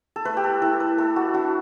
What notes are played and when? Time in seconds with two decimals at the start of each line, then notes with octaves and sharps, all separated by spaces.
0.16 A4
0.25 A3 B4
0.37 G4
0.44 A4
0.62 E4 A4
0.80 B4
0.98 A3 A4
1.16 F#4
1.34 D4 F#4